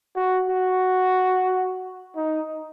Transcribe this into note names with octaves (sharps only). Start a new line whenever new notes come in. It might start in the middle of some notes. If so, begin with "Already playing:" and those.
F#4
F#4
D#4